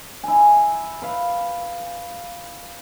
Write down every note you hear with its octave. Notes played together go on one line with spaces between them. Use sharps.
E4 G#5
B4 F5